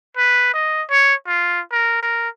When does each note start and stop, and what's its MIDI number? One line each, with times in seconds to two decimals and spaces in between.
0.17 0.52 71
0.53 0.82 75
0.90 1.14 73
1.27 1.60 65
1.72 2.00 70
2.02 2.29 70